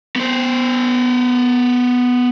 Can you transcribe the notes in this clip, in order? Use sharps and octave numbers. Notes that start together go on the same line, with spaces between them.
B3 C5